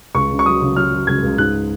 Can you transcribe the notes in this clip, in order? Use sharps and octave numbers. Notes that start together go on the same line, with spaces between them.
C#2 C#6
C#3
C#6
F#3 D#6
C#3
F#3 F6
F#3
C#2 G#6
C#2
G#2 F#6